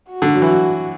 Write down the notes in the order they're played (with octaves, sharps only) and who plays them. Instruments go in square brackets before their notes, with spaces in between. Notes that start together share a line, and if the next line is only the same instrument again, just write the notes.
[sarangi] F#4
[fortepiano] D3
F#3
E3
F#3